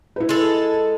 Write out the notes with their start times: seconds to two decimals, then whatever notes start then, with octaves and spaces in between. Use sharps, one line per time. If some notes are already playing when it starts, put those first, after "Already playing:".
0.16 E4 B4
0.29 G#3 A4